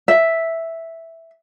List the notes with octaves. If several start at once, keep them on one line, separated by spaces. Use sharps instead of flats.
E5